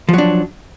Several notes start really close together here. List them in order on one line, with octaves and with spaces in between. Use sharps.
F3 F#3 D4